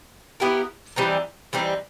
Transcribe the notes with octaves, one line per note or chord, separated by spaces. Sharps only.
B3 E4 G4 A#4
E3 G3 C4 D#4
E3 G3 C4 D#4